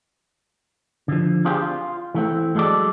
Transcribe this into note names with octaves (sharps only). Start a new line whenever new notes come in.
D3 F3
C4 D4 F4 G4 G#4 C5
F4
E3 A3 C4
F#3 G#3 G4 A4 D5